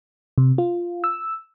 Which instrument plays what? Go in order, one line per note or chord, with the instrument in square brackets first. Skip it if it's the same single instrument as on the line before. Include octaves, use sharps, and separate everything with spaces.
[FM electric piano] C3
F4
E6